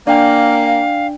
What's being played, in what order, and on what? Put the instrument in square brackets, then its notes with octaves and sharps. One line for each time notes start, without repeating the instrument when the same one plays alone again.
[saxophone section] A#3 [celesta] D4 [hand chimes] D5 G5 G#5 [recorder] F5